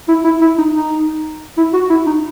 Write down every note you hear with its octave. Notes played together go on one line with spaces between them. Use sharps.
E4
E4
E4
D#4
D#4
E4
F#4
E4
D#4